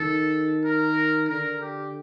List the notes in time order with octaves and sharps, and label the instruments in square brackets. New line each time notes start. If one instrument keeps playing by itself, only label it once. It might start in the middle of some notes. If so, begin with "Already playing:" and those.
Already playing: [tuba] D#3 [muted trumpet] A4
[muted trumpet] A#4
[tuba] D3 [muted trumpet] A#4
[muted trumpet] G4